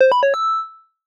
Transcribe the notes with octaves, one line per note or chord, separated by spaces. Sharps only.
C5
B5
C#5
E6